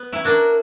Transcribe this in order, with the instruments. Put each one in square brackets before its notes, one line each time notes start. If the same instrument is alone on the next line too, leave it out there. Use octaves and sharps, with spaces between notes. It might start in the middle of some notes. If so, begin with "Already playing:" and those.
Already playing: [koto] B3
C#4 E4
[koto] D4 F#4 [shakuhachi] A#4